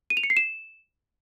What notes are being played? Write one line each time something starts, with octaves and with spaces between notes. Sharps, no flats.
D#7
F7
C#7
C7
E7